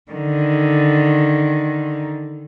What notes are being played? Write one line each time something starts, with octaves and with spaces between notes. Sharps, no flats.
D3 D#3